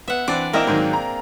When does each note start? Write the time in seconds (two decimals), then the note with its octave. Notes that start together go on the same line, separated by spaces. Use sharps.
0.08 B3 E5 F#5
0.28 E3 C4 D4 D5
0.53 A#3 C4 E4 A#4 D#5 E7
0.67 G#2 D#3 F#3 G#4
0.93 A#5